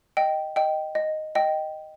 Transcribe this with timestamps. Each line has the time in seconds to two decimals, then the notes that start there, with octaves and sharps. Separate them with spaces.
0.17 D#5 G5
0.56 D#5 G5
0.95 D#5
1.35 D#5 G5